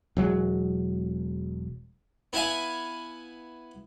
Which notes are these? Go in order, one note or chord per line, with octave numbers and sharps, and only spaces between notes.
E1 F#3 G#3
B3 E4 E5 F5 G#5